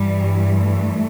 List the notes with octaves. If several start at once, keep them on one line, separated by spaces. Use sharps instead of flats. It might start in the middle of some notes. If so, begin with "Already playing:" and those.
Already playing: G2 E3 G3
A3